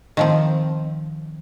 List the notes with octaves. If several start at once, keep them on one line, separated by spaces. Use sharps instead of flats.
D#3 F3 C4